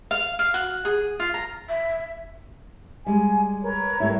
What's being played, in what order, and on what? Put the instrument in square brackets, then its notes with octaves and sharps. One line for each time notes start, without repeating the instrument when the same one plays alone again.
[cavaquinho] F5
F5
F#4
G#4
F4
A#5
[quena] E5
[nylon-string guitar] G3 G#3 [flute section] G#5
[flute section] A#4 B4 C#5
[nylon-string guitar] A2 G3 E4